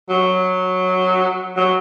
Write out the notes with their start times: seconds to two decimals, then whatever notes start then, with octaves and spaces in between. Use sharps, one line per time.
0.09 F#3
1.57 F#3